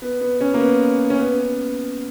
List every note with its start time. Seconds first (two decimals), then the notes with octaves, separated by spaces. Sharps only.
0.02 B3
0.21 B3
0.41 C#4
0.54 A#3
0.60 B3
1.10 C#4
1.18 B3